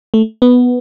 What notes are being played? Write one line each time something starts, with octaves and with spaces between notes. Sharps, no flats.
A3
B3